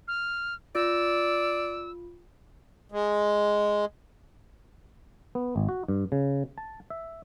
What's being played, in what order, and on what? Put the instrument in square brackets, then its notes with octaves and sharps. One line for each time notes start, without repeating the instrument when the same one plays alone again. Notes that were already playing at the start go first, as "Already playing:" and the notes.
[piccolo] F6
[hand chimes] F4 [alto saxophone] D5 [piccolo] E6
[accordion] G#3
[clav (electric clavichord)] B3
G#1
F#4
G2
C#3
A5
E5